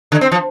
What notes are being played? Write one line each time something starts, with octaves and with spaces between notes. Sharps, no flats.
D3
C4
F3